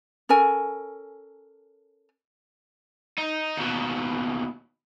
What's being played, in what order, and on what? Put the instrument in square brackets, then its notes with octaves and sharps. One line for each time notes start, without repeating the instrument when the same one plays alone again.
[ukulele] C#4 A4 A#4 G#5
[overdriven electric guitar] D#4
D#2 B2